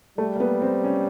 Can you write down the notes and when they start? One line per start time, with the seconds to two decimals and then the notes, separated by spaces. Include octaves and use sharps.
0.18 G3 A3
0.36 A#3
0.40 B3
0.62 C4
0.84 C#4